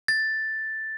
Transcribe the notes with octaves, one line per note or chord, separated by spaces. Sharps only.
A6